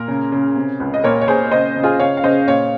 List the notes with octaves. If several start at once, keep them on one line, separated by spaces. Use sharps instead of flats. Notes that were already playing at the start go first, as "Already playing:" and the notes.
Already playing: A#2 A#4
C#3
C#3
C3
C#2
D#5
A#2 A#4 C#5
C#5
A#2 G#4 C5
C#3 C5 D#5
C#3
F4 G#4
C#3 C#5 F5
F5
C#3 C5 D#5
A#2 C#5 F5